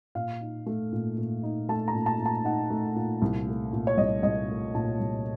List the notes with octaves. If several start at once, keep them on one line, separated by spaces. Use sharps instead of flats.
A#2 F5
D#4
A3
A#2
A#2
D#4
A3 A5
A#5
A#2
A5
A#2
A5
D#4 F#5
A3
A#2
C2
A3
A#2
C#5
C2 D#5
C2 D#5
A3
A#2 A5
C2